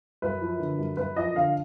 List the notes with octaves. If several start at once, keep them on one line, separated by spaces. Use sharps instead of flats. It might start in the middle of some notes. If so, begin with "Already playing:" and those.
F#2 B4
F3
D3
F#2
F#2 B4
F3 D#5
D3 F5